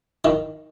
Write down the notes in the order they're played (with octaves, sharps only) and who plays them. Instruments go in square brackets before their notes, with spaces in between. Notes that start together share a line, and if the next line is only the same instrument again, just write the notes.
[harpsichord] D#3